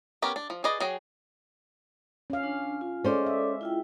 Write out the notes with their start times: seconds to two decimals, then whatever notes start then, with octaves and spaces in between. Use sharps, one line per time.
0.22 B3 C#4 G4 A#4
0.36 D4
0.50 F3
0.64 G#4 B4 D5 D#5
0.80 F#3 G#4 G5
2.30 C#4 F5
2.43 D4
2.81 F4
3.04 G#3 C#4 A4 C5 D5 D6
3.26 E5
3.61 E4 F4 G5